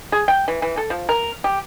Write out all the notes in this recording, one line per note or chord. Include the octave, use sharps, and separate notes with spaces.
G#4
G5
E3
E3
A4
F3
A#4
G4